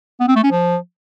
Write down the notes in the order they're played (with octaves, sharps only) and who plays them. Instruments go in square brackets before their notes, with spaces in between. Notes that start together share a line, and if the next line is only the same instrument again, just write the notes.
[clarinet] B3
C4
A3
C#4
F3